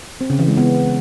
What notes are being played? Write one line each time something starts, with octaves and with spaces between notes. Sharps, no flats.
C4
C#3
E3
G#3
B3